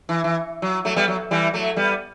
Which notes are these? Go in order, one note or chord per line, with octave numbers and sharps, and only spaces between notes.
E3
E3
F#3
F#3 A3
G3 B3
F#3
E3 G3
F#3 A3
G3 B3